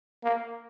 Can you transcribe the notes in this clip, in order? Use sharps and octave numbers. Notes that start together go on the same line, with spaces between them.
A#3